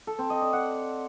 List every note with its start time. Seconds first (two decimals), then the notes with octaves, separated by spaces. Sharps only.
0.07 A4
0.19 C4
0.30 D#5
0.41 D5
0.53 F#5